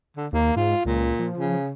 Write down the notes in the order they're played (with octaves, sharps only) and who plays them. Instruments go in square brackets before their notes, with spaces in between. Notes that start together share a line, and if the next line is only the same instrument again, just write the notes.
[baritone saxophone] D3
[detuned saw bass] D#2 [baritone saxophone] A#3
[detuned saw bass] G#2 [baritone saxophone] F4
[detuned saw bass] C#2 [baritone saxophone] A#2
[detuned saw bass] F3
[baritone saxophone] C#3